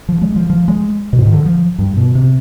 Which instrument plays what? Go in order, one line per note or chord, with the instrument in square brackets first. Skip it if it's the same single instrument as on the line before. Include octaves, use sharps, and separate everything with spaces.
[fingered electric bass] F3
G#3
F3
F3
G#3
B2
G#2
D#3
D3
F3
G2
B2
C3